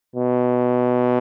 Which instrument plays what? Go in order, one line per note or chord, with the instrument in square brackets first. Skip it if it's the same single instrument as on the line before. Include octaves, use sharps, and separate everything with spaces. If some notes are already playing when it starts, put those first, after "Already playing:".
[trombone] B2